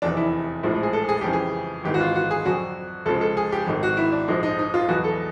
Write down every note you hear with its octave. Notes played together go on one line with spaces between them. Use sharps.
F1 E2 C3 D4
E4
A#1 A2 F3 G#3
G#4
A4
G#4
F2 C#3 E3 G4
G#4
G#1 G#2 E3 G4
F#4
F4
F#4
G#4
F2 D3 F#3 F#4
C#2 C#3 F3 G#3 A4
A4
G#4
G4
G#1 G#2 D#3
F#4
E4
D4
A#1 G#2 F3 G#3 D#4
D#4
D#4
F4
E2 B2 F#3 F#4
A4